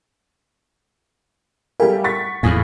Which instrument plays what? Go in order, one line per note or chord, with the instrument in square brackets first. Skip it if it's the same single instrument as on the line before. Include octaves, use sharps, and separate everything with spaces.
[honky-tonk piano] G3 A3 G4 [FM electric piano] A#4 F5 G#5
[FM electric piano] F#5 [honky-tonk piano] C#6 A6 B6
[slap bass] E2 A2 [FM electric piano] F5 G#5 D#6